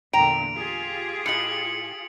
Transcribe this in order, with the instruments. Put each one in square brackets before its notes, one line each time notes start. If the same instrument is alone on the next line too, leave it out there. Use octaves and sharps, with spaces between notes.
[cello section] E2 A#2 D3 [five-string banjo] G5 [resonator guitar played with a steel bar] A#5 [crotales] D7 F7
[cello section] F4 G4 G#4
[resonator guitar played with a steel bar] A2 D#5 [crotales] C#7 F#7